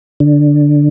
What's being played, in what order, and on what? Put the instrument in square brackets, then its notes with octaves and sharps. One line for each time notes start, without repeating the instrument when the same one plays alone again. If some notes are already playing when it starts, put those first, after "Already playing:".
[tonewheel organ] D3